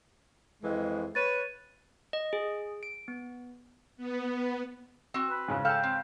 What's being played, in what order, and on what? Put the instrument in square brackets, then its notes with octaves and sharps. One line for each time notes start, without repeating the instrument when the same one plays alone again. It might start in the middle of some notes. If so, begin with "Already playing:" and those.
[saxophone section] F2 E3 G#3
[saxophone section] B4 C#5 [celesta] A6 D#7
[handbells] D#5
G#4
D7
B3
[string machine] B3
[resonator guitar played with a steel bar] C4 F#4
[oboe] B4
[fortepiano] G#2 C#3
[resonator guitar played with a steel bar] A4 A5 [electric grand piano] F5 F6 [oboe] G5
[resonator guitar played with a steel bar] C4